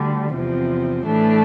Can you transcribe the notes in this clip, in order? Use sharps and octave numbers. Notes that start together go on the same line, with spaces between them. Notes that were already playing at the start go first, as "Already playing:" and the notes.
Already playing: D2 D3 G3
E2 C3 F3 C4
A2 E3 A3 D4